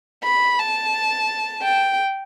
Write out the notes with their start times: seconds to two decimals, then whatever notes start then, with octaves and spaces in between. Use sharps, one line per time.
0.24 B5
0.59 A5
1.62 G5